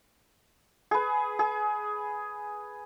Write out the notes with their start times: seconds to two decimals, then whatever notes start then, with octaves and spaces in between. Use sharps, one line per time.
0.91 G#4 B4
1.39 G#4